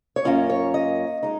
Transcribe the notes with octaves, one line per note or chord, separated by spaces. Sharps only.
C#5
F#2 F3 A#3 C#4 F4 D#5
C#5
D#5
G#3 D#4